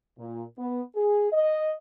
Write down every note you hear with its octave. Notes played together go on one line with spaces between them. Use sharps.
A#2
B3
G#4
D#5